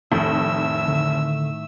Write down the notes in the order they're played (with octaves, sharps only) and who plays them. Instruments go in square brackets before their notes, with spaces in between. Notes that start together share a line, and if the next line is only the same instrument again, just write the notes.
[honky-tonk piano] F1 [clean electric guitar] A2 D#3 [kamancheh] E5 E6
[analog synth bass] D3